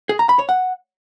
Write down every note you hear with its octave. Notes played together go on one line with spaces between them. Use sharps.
G#4
A#5
B5
C#5
F#5